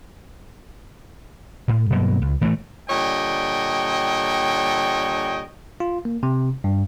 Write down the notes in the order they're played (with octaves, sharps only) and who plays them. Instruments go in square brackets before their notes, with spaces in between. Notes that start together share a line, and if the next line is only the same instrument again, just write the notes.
[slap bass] A2
G2 B2 F#3 A#3
C#2
A2 E3 G#3 A3
[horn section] A#2 D3 G3 C#5 D#5 G5
[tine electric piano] F4
A#3
C3
G2